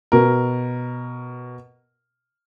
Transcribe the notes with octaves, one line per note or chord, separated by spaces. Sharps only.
B2 A#4